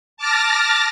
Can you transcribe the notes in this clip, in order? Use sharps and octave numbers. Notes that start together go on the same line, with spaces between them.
A5 D6 F6 A6 A#6